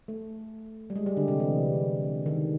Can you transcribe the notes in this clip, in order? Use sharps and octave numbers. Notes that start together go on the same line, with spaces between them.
A3
G3
G#3
G3
D3
C3
E3
D#3